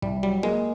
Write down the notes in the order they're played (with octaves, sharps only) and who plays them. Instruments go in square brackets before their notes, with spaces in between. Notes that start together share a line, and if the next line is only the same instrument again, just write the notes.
[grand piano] C2 [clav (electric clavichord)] G3
[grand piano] F#3 [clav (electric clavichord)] G3
[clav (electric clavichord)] G#3 [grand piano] A#3